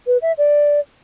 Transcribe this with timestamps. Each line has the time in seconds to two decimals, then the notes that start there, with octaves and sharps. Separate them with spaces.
0.07 B4
0.22 E5
0.38 D5